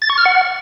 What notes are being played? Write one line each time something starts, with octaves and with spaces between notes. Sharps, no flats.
A6
C#6
F6
F#5